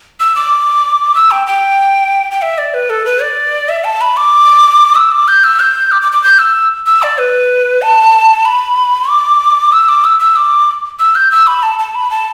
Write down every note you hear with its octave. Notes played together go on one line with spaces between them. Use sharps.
E6
D6
E6
G5
G5
G5
E5
D5
B4
A4
B4
D5
E5
A5
B5
D6
E6
D6
G6
E6
G6
D6
D6
D6
G6
E6
E6
D5
B4
A5
B5
D6
E6
D6
E6
E6
D6
E6
G6
E6
B5
A5
A5
B5
A5